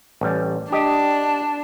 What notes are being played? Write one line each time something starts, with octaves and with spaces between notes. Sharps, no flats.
A1 G3
D4 G4 D#5